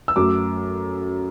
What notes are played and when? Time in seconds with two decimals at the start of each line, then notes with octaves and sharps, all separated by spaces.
0.08 E6
0.16 F#2 F#3 A3 D6